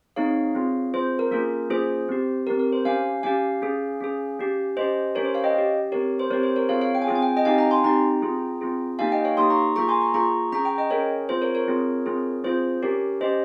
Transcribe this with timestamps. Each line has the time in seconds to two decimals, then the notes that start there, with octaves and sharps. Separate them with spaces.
0.16 C4 D#4 G#4 C#5 F5
0.55 C4 F4 G#4
0.94 C4 F4 G#4 C5
1.19 A#4
1.31 A#3 C#4 F4 G#4 A#4
1.70 A#3 C#4 F4 G#4 C5
2.09 C4 G4
2.47 C4 G4 A#4
2.59 A#4
2.72 C5
2.85 C#4 G4 F5 G#5
3.23 C#4 G4 F5 G#5
3.62 C#4 G#4
4.00 C#4 G#4
4.39 C#4 G4
4.77 C#4 G4 C5 D#5
5.15 C#4 G4 A#4 C#5
5.25 C5
5.34 C#5 F5
5.44 D#5 G5
5.54 C#4 G4
5.92 C4 G4 A#4 C#5
6.19 C5
6.30 C4 G4 A#4 C#5
6.43 C5
6.56 A#4 C#5
6.69 C4 F4 G#4 C#5 F5
6.81 C#5 F5
6.95 G5
7.02 G#5
7.07 C4 F4 G#4 G5
7.15 G#5
7.22 G5
7.29 G#5
7.37 D#5 G5
7.45 C4 D#4 G4 F5 G#5
7.58 G5 A#5
7.71 G#5 C6
7.84 C4 D#4 G4 G5 A#5
8.22 C4 F4 G#4
8.61 C4 F4 G#4
8.99 A#3 D#4 G4 F5 G#5
9.12 D#5 G5
9.24 C#5 F5
9.37 A#3 D#4 G4 C6 D#6
9.50 A#5 C#6
9.76 A#3 F4 G#4 A#5 C#6
9.89 G#5 C6
10.01 A#5 C#6
10.14 A#3 F4 G#4 A#5 C#6
10.52 C#4 G#4 A#5 C#6
10.65 G5 A#5
10.78 D#5 G5
10.91 C#4 G#4 A#4 C#5
11.29 C4 F4 G#4 C5
11.42 A#4 C#5
11.55 A#4 C#5
11.68 C4 F4 G#4
12.06 C4 F4 G#4
12.44 C4 F4 G#4 C5
12.83 C#4 G4 A#4 C#5
13.21 C#4 G4 C5 D#5